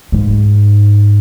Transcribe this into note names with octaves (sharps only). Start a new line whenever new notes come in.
G#2